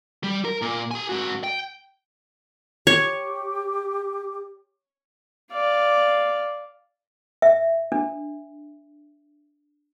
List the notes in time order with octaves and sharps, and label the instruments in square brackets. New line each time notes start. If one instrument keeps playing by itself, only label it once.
[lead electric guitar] G3
A#4
A#2
G4 G#5
G#2 F#4
G5
[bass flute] G4 [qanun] C#5
[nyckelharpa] D5 F5
[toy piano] E5
D4